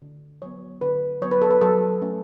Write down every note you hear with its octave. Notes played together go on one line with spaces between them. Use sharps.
D3
F#3 B3 C#5
D3 B4
F#3 B3 C#5
B4
A4
B4
F#3 A4
A3 C#4